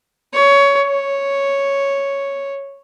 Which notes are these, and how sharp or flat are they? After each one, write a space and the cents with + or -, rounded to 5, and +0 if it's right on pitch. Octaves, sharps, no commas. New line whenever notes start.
C#5 +15
C#5 +0